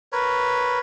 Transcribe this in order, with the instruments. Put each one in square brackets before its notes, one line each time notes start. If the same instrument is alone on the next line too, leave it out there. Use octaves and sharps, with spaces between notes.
[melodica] A#4 B4 C#5